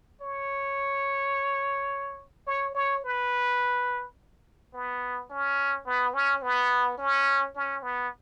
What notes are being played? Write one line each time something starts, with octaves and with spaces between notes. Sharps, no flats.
C#5
C#5
C#5
B4
B3
C#4
B3
C#4
B3
C#4
C#4
B3